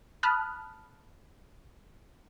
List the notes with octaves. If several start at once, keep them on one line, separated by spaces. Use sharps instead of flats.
A5 B5 D#6 F6 F#6